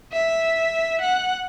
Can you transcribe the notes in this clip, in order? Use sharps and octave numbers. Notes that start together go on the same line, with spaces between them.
E5
F#5